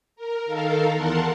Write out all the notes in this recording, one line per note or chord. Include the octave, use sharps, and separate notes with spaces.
A#4
D#3 A4 A#4 F5
E2 A#4 F#5 A5 C6